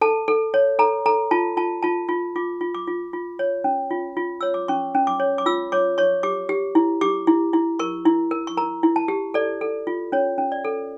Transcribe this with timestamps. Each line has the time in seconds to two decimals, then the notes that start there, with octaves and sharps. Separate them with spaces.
0.01 A4 A5
0.28 A4
0.54 C#5
0.79 A4 A#5
1.06 A4 A#5
1.31 F4 A5
1.57 F4 A5
1.83 F4 A5
2.08 F4
2.36 F4 D6
2.61 F4
2.75 D6
2.87 F4
3.13 F4
3.39 C#5
3.64 C#4
3.91 F4
4.17 F4
4.41 C#5 E6
4.54 D6
4.68 C#4 C#6
4.95 C#4
5.07 D6
5.20 C#5
5.38 D6
5.46 F4 E6
5.72 C#5 D6
5.98 C#5 C#6
6.23 G4 D6
6.49 G4
6.75 E4
7.01 G4 D6
7.27 E4
7.53 E4
7.79 A#4 C#6
8.06 E4
8.31 A#4
8.47 C#6
8.57 A#4 A#5
8.83 E4
8.96 A5
9.08 G4
9.34 A4 D5
9.61 A4
9.87 F4
10.12 C#4 C#5
10.38 C#4
10.52 D5
10.65 A4